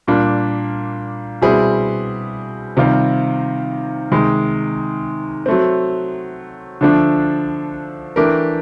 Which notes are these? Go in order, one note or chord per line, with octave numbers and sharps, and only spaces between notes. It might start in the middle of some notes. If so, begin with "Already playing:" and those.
A#2 G3 A#3 D4
B2 G3 C4 E4 G#4
C3 D#3 G3 C4 F4
C3 D#3 G#3
F#3 A3 C4
D3 F3 A3 D4
E3 A3 D4 G4 A#4